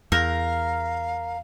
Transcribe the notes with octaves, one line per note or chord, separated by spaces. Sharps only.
E2 A#4 F5